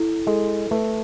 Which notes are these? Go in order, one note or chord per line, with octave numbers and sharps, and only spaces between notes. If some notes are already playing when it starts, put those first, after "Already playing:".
Already playing: E4 A4
G#3 A4
A3 B4